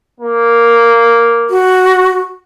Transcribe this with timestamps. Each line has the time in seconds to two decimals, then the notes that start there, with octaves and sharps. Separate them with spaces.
0.20 A#3
1.50 F#4